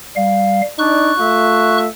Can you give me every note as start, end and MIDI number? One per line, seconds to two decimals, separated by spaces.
0.16 0.62 55
0.16 0.62 77
0.79 1.13 62
0.79 1.13 63
0.79 1.13 74
0.79 1.78 85
0.79 1.78 90
1.18 1.88 57
1.18 1.88 65
1.18 1.88 76